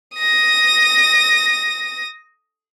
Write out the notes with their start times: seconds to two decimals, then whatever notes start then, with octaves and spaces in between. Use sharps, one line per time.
0.18 D#6 A#6